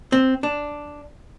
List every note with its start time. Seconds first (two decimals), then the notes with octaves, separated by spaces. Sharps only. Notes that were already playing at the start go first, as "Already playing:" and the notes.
0.12 C4
0.43 D4